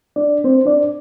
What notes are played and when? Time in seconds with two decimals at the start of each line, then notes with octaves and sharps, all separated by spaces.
0.16 D4 D5
0.44 C4 C5
0.66 D4 D5